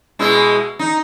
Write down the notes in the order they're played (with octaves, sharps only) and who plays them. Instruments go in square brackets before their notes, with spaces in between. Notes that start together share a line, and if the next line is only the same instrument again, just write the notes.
[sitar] B2 G#3 E4
D#4